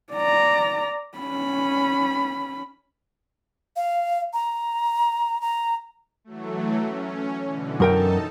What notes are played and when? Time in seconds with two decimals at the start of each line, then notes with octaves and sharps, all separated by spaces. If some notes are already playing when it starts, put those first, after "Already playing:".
0.14 D5 A#5
1.18 C#4 B5
3.77 F5
4.33 A#5
5.41 A#5
6.24 E3 F#3 A3
6.81 C#4
7.44 B2 D3 E3
7.80 F#2 D#4 A4 A#4 G5 A5